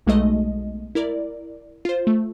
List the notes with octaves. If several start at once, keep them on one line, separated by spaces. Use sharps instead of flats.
B1 G#3 A3 D#5
E4 A#4 D5
F4 C5
A3